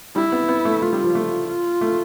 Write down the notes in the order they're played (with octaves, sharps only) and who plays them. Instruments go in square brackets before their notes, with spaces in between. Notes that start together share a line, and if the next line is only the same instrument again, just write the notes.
[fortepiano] G3 [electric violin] E4
[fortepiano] B3
B3
A3
[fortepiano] A3 [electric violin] F4
[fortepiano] G3
F3
A3
[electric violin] F4
[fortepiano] A3